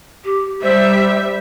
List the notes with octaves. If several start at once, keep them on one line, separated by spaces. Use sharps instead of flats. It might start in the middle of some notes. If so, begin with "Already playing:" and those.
G4
G3 C5 E5